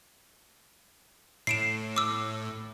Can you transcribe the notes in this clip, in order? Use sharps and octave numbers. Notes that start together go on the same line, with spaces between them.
A2 C7 D7 E7
D6 E6